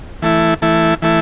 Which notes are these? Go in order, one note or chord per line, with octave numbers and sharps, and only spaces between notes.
E3 A3 E4
E3 A3 E4
E3 A3 E4